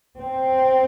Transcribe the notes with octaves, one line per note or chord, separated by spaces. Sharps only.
C4